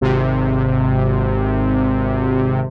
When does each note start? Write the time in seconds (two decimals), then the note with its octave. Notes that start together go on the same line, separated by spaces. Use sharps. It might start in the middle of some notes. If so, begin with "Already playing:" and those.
0.01 G#1 C3